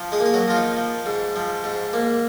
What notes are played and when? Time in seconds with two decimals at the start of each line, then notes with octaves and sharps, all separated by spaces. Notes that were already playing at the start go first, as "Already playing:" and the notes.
Already playing: F3
0.12 G#3 G#4
0.20 A#3
0.26 G#4
0.34 F#3 F#4
0.48 F3 F4
0.56 D#4
0.77 F3
1.06 G#2
1.36 F3
1.64 G#2
1.93 A#3